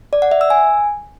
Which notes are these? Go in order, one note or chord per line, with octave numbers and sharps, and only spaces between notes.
D5
F#5
E5
E6
G#5